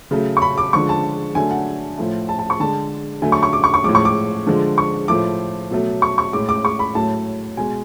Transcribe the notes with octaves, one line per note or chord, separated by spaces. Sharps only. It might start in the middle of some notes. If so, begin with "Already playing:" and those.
C#3 F#3 A3
C#6
B5
D6
D3 F3 G#3 C#6
A5
D3 F#3 A3 G#5
F#5
A2 F3 A3
A5
A5
C#6
D3 G#3 A5
D3 F#3 A3 G#5
C#6
C#6
D6
C#6
C#6
A2 F3 G#3 D6
C#6
D6
D3 F3 G#3
C#6
A2 F3 A3 D6
B2 F#3 A3
C#6
C#6
A2 G#3 D6
D6
C#6
B5
A2 F#3 A3 A5
B2 G#3 G#5